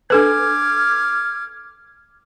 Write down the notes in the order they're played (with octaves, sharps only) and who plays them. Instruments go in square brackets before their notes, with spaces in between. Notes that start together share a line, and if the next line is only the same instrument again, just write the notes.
[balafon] D4 A4 B4 [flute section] D6 F6 G#6